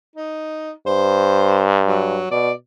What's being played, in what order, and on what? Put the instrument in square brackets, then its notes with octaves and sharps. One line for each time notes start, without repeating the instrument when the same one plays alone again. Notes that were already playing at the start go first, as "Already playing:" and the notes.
[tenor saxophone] D#4
[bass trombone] G2 [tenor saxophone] C5
[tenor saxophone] F#3
[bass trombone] B2 [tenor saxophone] D5